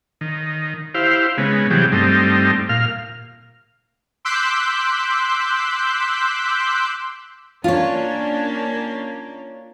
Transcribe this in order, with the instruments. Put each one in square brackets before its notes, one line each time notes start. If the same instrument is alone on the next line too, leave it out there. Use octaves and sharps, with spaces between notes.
[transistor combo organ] D#3
E4 G4 C5 F5
C#3 G#3 B3
C3 E3 F#3 G3 G4 G#4
G2 G3 A3 C4 D#4
A#2 F5 F6
[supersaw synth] C6 D6 E6 F#6 G6 B6
[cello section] A#3 C#4 D4 [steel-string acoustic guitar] F4 C#5